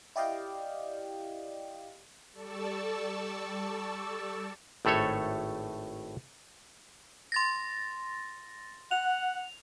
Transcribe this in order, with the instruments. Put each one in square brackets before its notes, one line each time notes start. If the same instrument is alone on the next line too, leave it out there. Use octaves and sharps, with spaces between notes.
[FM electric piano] E4 G4 D5 D#5 F5 G5
[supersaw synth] G3 A4 D5 A5 C#6 E6
[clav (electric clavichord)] G#1 A2 A3 A4 C#5
[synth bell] C6 A6 A#6
[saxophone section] F#5 [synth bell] F7